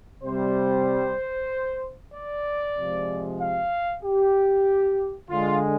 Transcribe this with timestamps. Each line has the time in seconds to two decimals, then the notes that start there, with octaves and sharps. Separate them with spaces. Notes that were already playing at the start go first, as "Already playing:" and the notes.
0.24 C3 G3 C5
2.14 D5
2.77 C3 F3 G#3
3.40 F5
4.03 G4
5.30 D3 G#3 F4